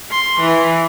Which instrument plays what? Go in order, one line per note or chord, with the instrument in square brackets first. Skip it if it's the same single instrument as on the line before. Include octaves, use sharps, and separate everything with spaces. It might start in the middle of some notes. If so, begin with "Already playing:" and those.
[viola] C6
E3